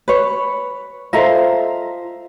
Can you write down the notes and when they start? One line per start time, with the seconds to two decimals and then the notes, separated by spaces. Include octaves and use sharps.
0.08 B4 C#5
1.13 F4 A4 C5 D#5 E5 A#5